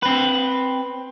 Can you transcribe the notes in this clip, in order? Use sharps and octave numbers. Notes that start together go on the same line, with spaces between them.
C4 B4